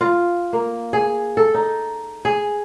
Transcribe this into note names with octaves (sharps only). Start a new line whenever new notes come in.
F4
A#3
G#4
A4
D#4
G#4